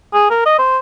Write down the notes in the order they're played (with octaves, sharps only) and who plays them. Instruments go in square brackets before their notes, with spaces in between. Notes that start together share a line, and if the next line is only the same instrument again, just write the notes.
[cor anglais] G#4
A#4
D#5
C5